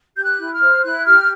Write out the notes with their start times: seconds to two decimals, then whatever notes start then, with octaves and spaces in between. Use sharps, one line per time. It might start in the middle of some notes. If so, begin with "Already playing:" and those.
0.16 G4 G6
0.23 F#6
0.38 E4
0.53 F6
0.61 C5
0.83 E4 F#6
1.05 G4 F6